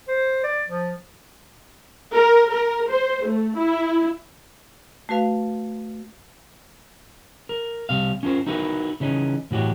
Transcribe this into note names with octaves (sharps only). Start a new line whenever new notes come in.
C5
D5
F3
A#4
A#4
C5
A3
E4
A3 F#4 B4 F5
A#4
C2 C3 F5
C#4 F4 A#4 C5
D#4 E4 F#4 A#4 B4
C#3 E3 C#4 D#4
A2 E3 F#4 G4 C#5